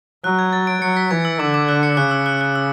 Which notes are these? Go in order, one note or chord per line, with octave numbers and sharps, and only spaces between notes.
F#3 F#6
G#6
A6
D7
F#3 C#7
B6
E3 G#6
E6
D3 D6
D6
F#6
C#7
C#3 F#6
E6
F#6
F#6
E6